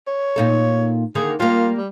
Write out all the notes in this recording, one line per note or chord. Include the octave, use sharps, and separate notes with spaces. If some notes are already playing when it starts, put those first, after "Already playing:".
C#5
A#2 D#4 A4
D3 D#3 A#3 G#4
G3 A#3 F4
G3